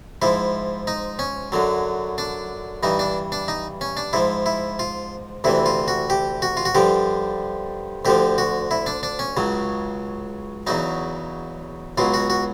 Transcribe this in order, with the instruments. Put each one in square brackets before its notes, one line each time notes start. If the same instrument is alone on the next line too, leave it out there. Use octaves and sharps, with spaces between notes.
[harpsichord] G#2 F3 E4
D#4
C#4
F#2 D3 F#3
D4
G2 E3 D#4
D4
D4
D#4
C#4
D4
G#2 F3 E4
E4
F4
D2 C3 E3 E4
F4
F#4
G4
F#4
F4
F#4
G2 D3 F3 G4
D2 D3 F3 G4
F#4
E4
D4
D4
C#4
C#2 C#3 F#3
E2 C#3 F#3 D#4
C#2 B2 F#3 F4
F#4
F#4